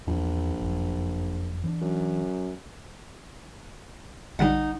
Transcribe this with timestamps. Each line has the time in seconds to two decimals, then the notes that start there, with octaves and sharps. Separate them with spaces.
0.07 A#1 E2 F3
0.60 F#1 F2
1.64 E3 C4 D4
1.81 F#2
4.39 A#1 D3 G3 D#4 F#5